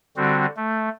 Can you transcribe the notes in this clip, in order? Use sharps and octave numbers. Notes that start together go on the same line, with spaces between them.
D3 G3 C4 F#4
A3